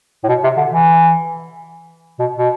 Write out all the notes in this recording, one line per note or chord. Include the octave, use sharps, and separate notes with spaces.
A2
B2
C3
D3
E3
B2
B2